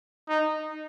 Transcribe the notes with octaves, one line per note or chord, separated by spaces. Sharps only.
D#4